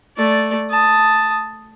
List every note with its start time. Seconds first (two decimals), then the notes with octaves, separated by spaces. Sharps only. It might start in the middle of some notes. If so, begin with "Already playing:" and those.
0.17 A3 D5
0.70 A5 D#6